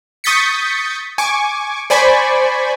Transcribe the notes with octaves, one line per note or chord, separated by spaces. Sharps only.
C#6 D#6 G6 A6 B6 C#7
G#5 C#6 D6
C5 D5 G#5 B5 C#6